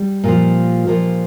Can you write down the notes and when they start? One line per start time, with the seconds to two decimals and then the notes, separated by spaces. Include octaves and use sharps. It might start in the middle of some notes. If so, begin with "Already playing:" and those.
Already playing: G3
0.24 A#2 F3
0.87 A#2 F3